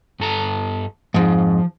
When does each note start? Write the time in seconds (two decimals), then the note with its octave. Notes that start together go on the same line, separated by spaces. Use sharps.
0.20 G2 A4 A#5
1.14 F2 G#2 F3